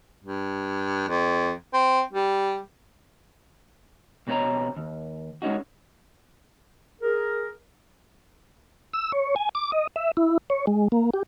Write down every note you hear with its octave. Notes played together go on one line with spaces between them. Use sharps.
G2
F2
C4
G3
B1 B2 C4 C#5 D#5 A#5
D#2
G#3 C#4 D#4 F#4
G#4 A#4
E6
C#5
G#5
D6
D#5
E5
E4
C#5
G#3
A#3
G4